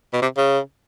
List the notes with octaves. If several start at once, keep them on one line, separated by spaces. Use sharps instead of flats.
B2
C3
C#3